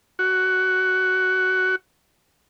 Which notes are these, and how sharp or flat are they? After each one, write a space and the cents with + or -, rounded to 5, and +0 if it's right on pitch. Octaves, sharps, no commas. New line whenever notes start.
F#4 +10